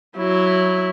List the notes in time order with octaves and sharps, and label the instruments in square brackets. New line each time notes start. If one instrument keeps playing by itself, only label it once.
[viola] F#3 E4